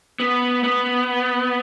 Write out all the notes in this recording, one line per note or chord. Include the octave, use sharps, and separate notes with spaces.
B3
B3